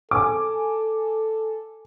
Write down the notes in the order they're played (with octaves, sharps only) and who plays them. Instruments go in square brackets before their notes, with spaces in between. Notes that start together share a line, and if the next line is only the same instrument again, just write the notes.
[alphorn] A4 [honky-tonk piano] G#5 D6